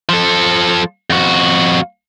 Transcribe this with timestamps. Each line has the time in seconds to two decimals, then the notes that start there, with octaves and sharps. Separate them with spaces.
0.09 F3 A4
1.10 F2 F#4